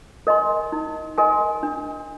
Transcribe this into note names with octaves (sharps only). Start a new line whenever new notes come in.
A#4 D#5 G#5 C6
D#4
A#4 D#5 G#5 C6
D4